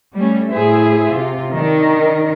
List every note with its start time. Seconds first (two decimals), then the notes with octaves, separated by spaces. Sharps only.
0.15 G3 A3 C#4
0.50 A2 E4 G#4 C5 E5
1.12 C3 F4
1.55 D#3 D4 A#4